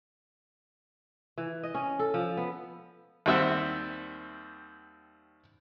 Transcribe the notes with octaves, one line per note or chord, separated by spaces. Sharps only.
E3
D#5
C#4
A4
F3
B3
D#2 G3 C4 E5 F#5 E6